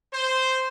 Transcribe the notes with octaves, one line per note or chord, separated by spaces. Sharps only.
C5